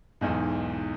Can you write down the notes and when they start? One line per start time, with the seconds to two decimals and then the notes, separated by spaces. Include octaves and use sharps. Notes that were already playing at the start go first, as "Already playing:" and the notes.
0.21 B1 E2 G#2